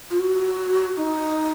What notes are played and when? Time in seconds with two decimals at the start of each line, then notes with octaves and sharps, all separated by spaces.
0.11 F4
0.19 F#4
0.97 D#4